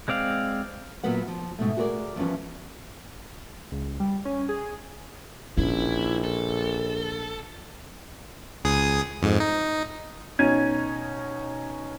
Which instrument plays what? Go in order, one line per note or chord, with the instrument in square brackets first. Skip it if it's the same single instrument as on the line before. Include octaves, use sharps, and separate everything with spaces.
[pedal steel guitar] G#3 C4 D5 F5
[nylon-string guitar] A#2 F#3 B3 B4 F#5
F3
G#2 B2 A3
F#4 G#4 A#4 B4 D5
E2 F3 G3 C#4 B4
[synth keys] C#2
G3
C#4
G#4
[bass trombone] A#1 [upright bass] C#4 [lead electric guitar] E4
[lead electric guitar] A4
[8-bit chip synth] C#2 G#4 D#6
F2 G#2
D#4
[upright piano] B2 C#4 D#4 G#6 D#7